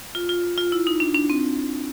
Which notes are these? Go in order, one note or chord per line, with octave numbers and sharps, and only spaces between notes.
F4
F4
F4
E4
D#4
D4
D4
C4